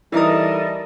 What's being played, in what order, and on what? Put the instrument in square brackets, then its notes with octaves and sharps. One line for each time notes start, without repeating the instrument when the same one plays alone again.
[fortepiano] E3 A#4 D#6 [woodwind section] G3 [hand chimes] D#4 E5 [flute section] A4 D#5